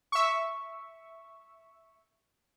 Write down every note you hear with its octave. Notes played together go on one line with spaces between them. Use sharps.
E5 C#6